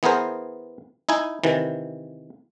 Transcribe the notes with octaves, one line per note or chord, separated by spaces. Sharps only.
E3 B3 G#4 A#4 C5
D#4 E4 G#5
C3 D#3 E3